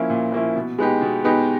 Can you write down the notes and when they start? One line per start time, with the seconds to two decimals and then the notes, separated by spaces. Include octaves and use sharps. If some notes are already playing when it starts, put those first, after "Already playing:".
Already playing: F3 A#3 C#4 E4
0.10 A#2
0.32 F3 A#3 C#4 E4
0.56 B2
0.78 G#3 B3 D#4 G4
1.02 B2
1.24 G#3 B3 D#4 G4